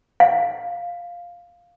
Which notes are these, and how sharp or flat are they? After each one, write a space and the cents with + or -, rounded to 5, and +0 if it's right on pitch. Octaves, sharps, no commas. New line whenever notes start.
F5 +0